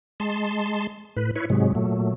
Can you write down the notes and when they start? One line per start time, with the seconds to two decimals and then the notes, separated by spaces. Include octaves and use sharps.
0.20 G#3 A5 C6
1.17 A2 B4
1.35 E4 B4 C#5
1.50 G#2 C3 F#3 G#3
1.75 A#2 F#3 A3